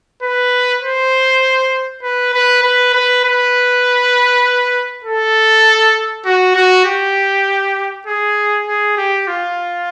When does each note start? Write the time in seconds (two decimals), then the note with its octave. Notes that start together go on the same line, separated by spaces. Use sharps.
0.23 B4
0.82 C5
2.03 B4
2.34 B4
2.63 B4
2.94 B4
3.24 B4
5.04 A4
6.25 F#4
6.55 F#4
6.85 G4
8.07 G#4
8.67 G#4
8.97 G4
9.28 F4